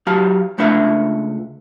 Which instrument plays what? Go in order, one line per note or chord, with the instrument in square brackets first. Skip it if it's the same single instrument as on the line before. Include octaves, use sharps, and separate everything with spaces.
[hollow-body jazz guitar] F#3 G4 F5 A5
C#2 A3 D4 B4 E5 F5